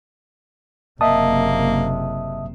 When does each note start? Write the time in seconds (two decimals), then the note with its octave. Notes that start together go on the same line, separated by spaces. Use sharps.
1.01 F#1 C3 A#3 D#5 E5 A5 D#6